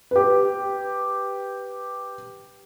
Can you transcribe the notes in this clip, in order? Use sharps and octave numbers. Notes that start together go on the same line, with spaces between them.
G4 B4